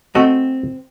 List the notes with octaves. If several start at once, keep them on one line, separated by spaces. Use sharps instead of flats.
A3 C4 F#4 D#5